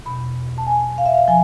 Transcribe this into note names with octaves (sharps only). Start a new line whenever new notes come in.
E2 B2 B5
A5
G#5
F5
E5
F5
F3 G#5